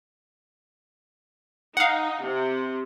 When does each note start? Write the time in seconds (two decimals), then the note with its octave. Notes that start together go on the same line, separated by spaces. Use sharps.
1.77 D#4 F5 F#5
2.25 C3